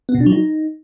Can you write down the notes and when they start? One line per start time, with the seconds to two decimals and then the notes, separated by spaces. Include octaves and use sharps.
0.09 B3
0.15 B2
0.20 D4
0.26 F#3
0.32 D#4